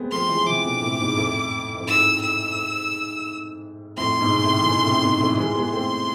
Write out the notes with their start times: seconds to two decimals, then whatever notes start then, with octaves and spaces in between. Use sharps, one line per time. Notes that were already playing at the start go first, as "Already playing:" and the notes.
Already playing: G#3 A3 B3 C4
0.11 F3 A3 C6
0.28 E3 G#3
0.40 F3
0.46 C3 E3 D6
0.64 B2 D3
0.82 A2 C3
0.99 G#2 B2
1.16 F2 A2
1.77 F2
1.87 G#2 E6
2.22 E6
3.97 F2 A2 C6
4.21 G#2 B2
4.44 A2 C3
4.61 E3
4.67 B2 D3
4.85 A2 C3
5.03 G#2 B2
5.20 F2 A2
5.37 E3 G#3 C6
5.56 G#3 B3
5.72 A3 C4